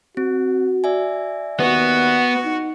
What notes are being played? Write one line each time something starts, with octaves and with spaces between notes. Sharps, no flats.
C4 F#4
D5 E5 G#5
D#2 B3 F#4
D#4